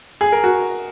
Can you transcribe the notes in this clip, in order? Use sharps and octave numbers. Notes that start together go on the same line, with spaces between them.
G#4
A#4
F#4